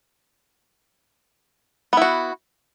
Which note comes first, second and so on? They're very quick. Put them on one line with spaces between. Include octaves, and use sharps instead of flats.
B3 E4 F#4